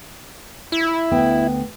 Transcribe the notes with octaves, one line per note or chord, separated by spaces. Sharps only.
E4
D2 B3 G5